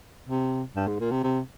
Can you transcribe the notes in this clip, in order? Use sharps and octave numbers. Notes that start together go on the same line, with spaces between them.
C3
G2
G#2
A#2
C3
C3